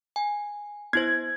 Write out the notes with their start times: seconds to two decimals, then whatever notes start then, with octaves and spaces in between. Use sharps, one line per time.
0.16 G#5
0.93 B3 E4 C5 G#6